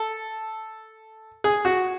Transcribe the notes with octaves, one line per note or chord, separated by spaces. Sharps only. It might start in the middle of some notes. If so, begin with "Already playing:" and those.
Already playing: A4
G#4
F#4